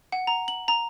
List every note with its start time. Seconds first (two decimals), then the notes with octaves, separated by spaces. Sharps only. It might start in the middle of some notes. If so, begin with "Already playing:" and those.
0.12 F#5
0.27 A#5
0.48 F#7
0.68 A#5